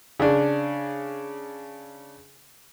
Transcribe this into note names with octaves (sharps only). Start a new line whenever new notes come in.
C#3 D4